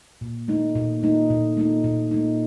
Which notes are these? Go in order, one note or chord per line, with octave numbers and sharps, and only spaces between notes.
A#2
A3 D#4
A#2
A3 D#4
A#2
A3 D#4
A#2
A3 D#4